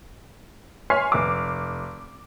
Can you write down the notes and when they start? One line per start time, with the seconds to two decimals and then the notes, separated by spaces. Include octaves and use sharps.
0.90 C#5 G#5 C6 F6 B6 C7
1.12 F1 D6